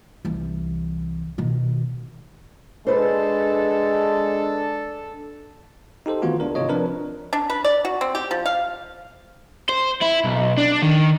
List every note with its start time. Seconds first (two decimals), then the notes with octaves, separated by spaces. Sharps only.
0.25 C2 E3
1.38 B2 D#3
2.87 G#3 D4 A4 B4 C5
6.06 D#4 G4 A4 C5
6.22 D#3 E3 A3 B3 F4 F#4
6.40 C#2 D4 A#4
6.55 G#1 C3 F4 C#5 D#5
6.69 F3 C4 D4 A#4 B4
7.33 D4
7.50 B4
7.64 D5
7.85 F#4
8.01 C4
8.15 G4
8.31 F3
8.46 F5
9.69 C5
10.01 E4
10.24 B1
10.57 D4
10.82 D#3